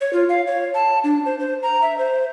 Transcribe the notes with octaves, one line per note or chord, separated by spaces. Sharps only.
C#5
F4
F5
C#5
A5
D4
C5
C5
A#5
E5
C5